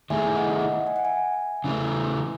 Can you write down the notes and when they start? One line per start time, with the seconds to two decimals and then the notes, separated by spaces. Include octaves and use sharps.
0.10 D#3 A3 E4 G#4 E5 G#5
0.36 D#5 F#5
0.50 E5
0.61 D#5 F#5
0.87 G#5
0.96 F#5
1.05 E5 G#5
1.64 C#3 E3 A3